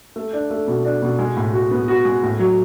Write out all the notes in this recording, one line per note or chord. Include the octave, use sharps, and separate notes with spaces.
A3
D4
A3
B2
D4
B2
G#3
A2
F#4
B3
F#4
G#3
A2
F#3